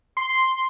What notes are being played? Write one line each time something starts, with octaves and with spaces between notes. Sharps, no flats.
C6